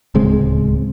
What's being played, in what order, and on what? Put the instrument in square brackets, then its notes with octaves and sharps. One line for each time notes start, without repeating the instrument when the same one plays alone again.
[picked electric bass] D1 C#2 G#3 C4